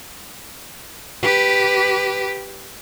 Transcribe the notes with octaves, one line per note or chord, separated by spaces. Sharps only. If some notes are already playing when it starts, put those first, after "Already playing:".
G4 B4